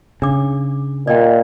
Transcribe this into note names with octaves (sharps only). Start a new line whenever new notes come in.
C#3 D4 D6
A#2 D5 D#5 G5